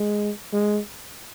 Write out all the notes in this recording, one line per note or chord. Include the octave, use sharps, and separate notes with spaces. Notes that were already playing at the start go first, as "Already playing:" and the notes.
Already playing: G#3
G#3